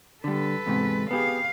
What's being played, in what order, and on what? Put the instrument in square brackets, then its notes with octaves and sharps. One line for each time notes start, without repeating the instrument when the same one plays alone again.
[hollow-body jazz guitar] D3 G3 [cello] A4 B4
[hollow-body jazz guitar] E2 G#2 C3
[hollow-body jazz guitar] B3 G4 G#4 [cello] F5